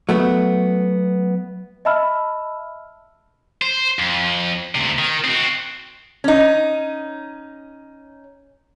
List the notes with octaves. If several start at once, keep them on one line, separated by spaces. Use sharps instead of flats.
F#3 A3 B3
D#5 E5 A5 B5 E6 F6
C5
F2
D2 C3
D#3
C4 F#4
C#4 D#4